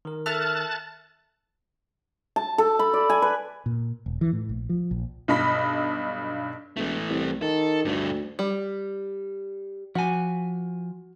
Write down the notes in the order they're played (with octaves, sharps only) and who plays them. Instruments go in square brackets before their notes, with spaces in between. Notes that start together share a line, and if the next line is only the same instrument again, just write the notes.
[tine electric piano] D#3 A#4
[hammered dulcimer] A4 E5 [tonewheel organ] A5 F#6 A6 [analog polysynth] F6
[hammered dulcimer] A5
A4
B5
D5
G#5
B4
[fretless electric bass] A#2
E1
E3
A2
A#1
F3
A#1
[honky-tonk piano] B1 G2 D#5 B5 B6
[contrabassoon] E1 [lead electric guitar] E3 A3
[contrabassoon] C2
[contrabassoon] D#3 [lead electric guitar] A4
[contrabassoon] D2 [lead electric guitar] G2 A3
[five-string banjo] G3
[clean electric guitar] F3 G#5 [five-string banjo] F#4